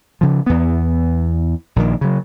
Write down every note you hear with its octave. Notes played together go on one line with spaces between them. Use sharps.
C#3 F3
E2 B3
A#1 A#2 D3 D#3
C#3 F#3